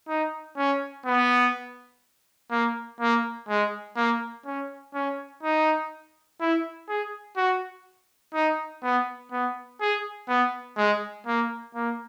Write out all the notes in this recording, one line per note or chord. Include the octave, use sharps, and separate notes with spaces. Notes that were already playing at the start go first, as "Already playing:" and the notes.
D#4
C#4
B3
A#3
A#3
G#3
A#3
C#4
C#4
D#4
E4
G#4
F#4
D#4
B3
B3
G#4
B3
G#3
A#3
A#3